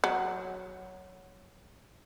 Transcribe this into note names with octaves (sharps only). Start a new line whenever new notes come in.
F#3